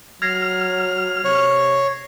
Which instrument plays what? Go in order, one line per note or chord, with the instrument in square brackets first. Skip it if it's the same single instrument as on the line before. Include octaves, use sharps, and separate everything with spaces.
[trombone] F#3 [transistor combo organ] F6 [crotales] G#6 A#6 C7
[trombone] C3 [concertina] C#5